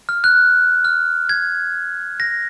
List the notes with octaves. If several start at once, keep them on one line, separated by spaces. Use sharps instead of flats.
F6
F#6
F6
G#6
A#6